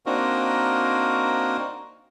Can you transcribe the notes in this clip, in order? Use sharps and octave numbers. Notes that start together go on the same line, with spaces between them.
A#3 C4 D4 D#4 F#4 A#4